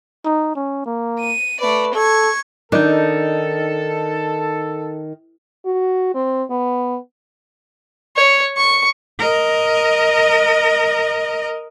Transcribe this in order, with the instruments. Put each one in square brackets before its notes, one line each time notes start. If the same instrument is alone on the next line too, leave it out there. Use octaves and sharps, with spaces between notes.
[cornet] D#4
C#4
A#3
[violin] D#7
[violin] A3 D5 [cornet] B4
[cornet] A4 [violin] C#6 G#6
[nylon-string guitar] D#3 [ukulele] D4 D#4 [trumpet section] A4
[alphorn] F#4
C4
B3
[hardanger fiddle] C#5
C#6
[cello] A#4 D#5